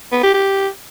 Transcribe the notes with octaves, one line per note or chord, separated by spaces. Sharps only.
B3
G4
G4